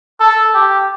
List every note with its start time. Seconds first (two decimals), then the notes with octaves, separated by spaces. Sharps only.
0.20 A4
0.54 G4